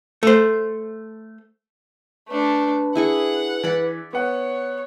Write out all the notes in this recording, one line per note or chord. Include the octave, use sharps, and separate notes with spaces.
A3 C5
A3 D4 B4
E4 G#4 F#5 C#6
E3 D5 B5
B3 C#5 F#5